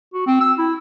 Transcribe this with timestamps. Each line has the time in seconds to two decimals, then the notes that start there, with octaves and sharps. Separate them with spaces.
0.13 F#4
0.27 C4
0.40 E6
0.58 E4